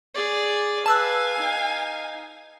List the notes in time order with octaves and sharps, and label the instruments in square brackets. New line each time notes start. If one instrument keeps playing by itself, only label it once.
[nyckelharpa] G#4 D5
[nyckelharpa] B4 [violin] F5 G#5 [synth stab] A5 E6 F#6
[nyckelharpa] D#4